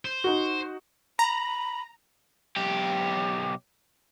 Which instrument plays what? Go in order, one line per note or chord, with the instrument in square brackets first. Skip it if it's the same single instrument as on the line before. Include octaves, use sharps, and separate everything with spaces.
[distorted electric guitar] C5
[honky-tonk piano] D#4 F#4
[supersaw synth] A#5 [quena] B5
[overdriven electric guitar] B1 G4